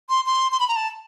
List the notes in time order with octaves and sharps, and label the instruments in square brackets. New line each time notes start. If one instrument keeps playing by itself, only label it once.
[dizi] C6
C6
C6
B5
A#5
A5